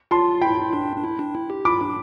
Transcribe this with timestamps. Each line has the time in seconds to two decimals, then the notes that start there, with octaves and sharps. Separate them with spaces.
0.11 F4 A5 C6
0.41 E4 G5 B5
0.62 E4
0.73 D4
0.96 D4
1.04 E4
1.19 D4
1.35 E4
1.50 G4
1.65 F4 B5 D6
1.81 D4